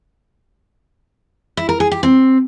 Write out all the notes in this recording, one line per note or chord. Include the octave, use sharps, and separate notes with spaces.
E4
A#4
G#4
G4
C4